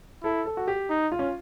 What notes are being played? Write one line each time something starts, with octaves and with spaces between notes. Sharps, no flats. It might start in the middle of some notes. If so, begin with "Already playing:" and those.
E4 A4
A4
F#4
G4
D#4
F4
C#4